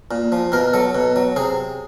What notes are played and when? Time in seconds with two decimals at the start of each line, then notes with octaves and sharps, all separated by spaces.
0.11 A#2
0.32 F3
0.52 B2 A#4
0.73 F#3 A4
0.95 B2
1.16 F#3
1.36 C3 G#4